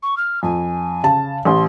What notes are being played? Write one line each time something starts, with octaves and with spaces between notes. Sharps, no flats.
C#6
F6
F2 G#5
C#3 A5
A1 C6